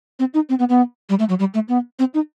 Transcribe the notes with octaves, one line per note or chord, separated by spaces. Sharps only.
C4
D#4
C4
B3
B3
G3
A3
F#3
G3
A3
B3
C4
D#4